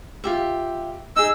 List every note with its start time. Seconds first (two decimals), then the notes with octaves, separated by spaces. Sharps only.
0.24 F4 G4 E5
1.16 D#4 G#4 E6